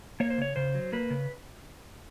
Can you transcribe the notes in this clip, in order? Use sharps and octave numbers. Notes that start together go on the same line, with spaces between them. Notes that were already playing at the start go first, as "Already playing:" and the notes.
A#3 C#5
C5
C#3 C#5
C#3 C5
F#3
A#3 B4
C#3